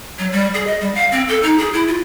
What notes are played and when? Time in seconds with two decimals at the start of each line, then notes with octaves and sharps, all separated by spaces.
0.19 F#3
0.32 G3
0.54 G#4
0.67 D#5
0.81 G3
0.95 F5
1.12 C4
1.28 A4
1.43 D#4
1.58 G#4
1.73 E4
1.88 F4